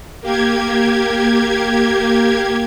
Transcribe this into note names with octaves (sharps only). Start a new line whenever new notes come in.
A#3 G4 G#6